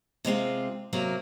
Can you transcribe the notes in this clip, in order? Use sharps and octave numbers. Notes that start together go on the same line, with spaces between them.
C3 G#3 C4 F4
C3 F#3 A#3 A#4